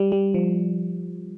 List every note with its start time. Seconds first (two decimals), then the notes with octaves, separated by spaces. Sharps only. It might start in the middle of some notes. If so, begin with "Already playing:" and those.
Already playing: G3
0.12 G3
0.34 F3